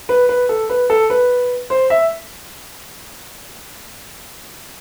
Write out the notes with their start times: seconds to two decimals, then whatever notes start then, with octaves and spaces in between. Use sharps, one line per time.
0.09 B4
0.29 B4
0.49 A4
0.69 B4
0.90 A4
1.10 B4
1.70 C5
1.90 E5